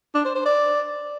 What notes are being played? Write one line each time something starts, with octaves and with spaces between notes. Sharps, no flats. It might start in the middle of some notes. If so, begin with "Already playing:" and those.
D4
C5
C5
D5